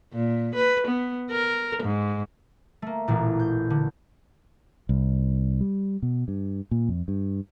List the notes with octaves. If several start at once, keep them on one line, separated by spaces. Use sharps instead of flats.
A#2
B4
B3
A#4
G#2
A3 A#3
E1 A1 A#2
G6
D3
C2
G3
B2
G2
A#2
F2
G2